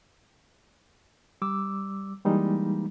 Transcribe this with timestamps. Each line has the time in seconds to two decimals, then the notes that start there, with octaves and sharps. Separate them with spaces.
1.42 G3 D6 E6
2.25 E3 G3 G#3 A#3 D#4